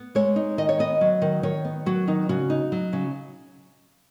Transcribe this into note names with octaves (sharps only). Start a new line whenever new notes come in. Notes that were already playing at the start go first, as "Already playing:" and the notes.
Already playing: B3
G#3 C#5
D#4
D#3 D#5
C#5
B3 D#5
F#3
D#3
D#3 C#5
B3
F#3 F#4
D#3 D#4
C#3 F#4
D#4
F#3
C#3